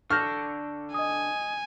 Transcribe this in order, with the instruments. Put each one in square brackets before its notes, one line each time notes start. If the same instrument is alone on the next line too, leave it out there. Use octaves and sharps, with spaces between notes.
[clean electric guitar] D3 A4 [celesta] C#6 G6 A#6 [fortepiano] F6
[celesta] D#5 D#6 [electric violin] G#5